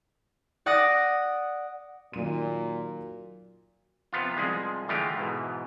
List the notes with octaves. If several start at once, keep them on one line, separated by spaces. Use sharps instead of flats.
D5 F#5 D6 D#6 F#6 A#6
A#2 D#3 F#3 D#7
C3 F3 B3 F4
C2 F3 G#3 G#4
D3 E3 G#3 A3 F4 G4
G#2 B2 E3